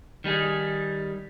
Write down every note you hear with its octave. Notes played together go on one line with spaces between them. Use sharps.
D#3 G3 D#4 G#4